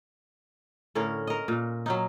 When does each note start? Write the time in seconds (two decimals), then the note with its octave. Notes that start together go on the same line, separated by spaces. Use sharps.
0.95 A2 D3 C#4 A#4
1.27 A#4 D#5
1.48 A#2
1.86 F#3 C#4 D#4